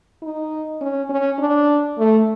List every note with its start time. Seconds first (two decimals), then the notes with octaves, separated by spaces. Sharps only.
0.23 D#4
0.81 C#4
1.10 C#4
1.39 D4
1.98 A3